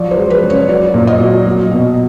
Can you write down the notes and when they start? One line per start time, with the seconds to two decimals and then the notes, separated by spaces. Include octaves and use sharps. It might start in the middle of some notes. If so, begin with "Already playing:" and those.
Already playing: F3 F#3 D5
0.11 C5
0.17 G#3
0.30 B4
0.43 C#3
0.50 C#5
0.68 F#3 D5
0.94 A#2
1.07 D#5
1.20 F#3
1.46 F#3
1.71 B2